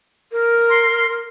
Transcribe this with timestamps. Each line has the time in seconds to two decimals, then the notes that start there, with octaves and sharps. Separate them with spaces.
0.32 A#4
0.70 C6